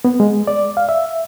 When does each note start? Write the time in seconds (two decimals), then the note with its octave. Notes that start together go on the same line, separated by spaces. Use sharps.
0.05 B3
0.20 G#3
0.47 D5
0.77 F5
0.89 E5